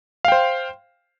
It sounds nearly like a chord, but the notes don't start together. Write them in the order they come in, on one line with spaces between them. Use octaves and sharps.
F5 G5 C5